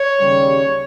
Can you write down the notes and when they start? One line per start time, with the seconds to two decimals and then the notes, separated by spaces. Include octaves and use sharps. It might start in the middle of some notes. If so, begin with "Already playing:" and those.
Already playing: C#5
0.19 D#2 C#3 G3